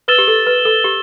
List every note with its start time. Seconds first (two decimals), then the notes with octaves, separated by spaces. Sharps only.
0.08 B4 E6 A6 E7 G7
0.18 G4
0.28 A4
0.46 B4
0.65 A4
0.84 G4